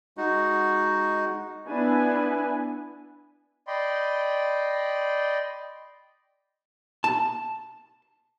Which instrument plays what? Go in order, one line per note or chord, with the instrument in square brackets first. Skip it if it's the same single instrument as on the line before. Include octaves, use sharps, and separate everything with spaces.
[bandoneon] G#3 D#4 F#4
[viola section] B3 D4 E4 B4 G#5
[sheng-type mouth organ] D5 D#5 G5 B5 C6
[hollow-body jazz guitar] A5